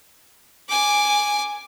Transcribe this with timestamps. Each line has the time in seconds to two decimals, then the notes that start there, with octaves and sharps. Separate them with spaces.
0.69 G#5 D6